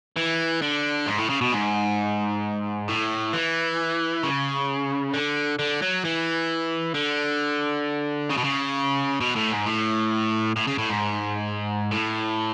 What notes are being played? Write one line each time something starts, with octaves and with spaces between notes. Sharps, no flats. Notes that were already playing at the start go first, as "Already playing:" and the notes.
E3
D3
G#2
A2
C#3
B2
G#2
A2
E3
C#3
D3
D3
F#3
E3
D3
C#3
B2
C#3
B2
A2
G#2
A2
A2
C#3
A2
G#2
A2